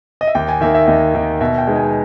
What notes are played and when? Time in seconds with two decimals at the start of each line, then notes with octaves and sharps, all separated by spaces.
0.21 D#5
0.27 E5
0.35 D#2 G5
0.48 G#5
0.61 D#3 A#3 E5
0.75 E5
0.87 D#2 D#5
1.15 D#3 A#3
1.41 B2 E5
1.58 G5
1.67 G#3 B3 D#4
1.76 G#5